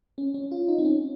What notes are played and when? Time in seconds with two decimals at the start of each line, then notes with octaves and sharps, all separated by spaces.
0.18 C#4
0.34 C#4
0.51 F4
0.68 D#4
0.78 C4
0.85 C#4